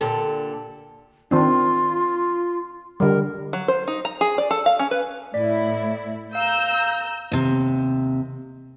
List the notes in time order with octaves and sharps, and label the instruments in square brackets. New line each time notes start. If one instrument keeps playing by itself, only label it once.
[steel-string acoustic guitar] A#2 D3 G4 A4
[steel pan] D#3 C4 D4 [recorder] F4
[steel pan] D3 G3 [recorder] A#4
[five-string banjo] F#3
C5
D#4
A#5
G#4
D5
A4
F5
C#4
B4
[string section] A2 E4 [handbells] D5 B6
[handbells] F5 [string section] A#5 E6 G6
[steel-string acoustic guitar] D#2 C3